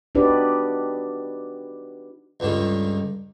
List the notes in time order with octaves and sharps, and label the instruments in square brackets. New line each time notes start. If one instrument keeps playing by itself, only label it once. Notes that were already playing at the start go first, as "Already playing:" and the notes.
[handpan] D4 D#4 F#4 G4 B4 D5
[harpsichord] C#2 G2 D3 D#3